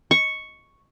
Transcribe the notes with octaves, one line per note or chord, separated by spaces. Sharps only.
C#6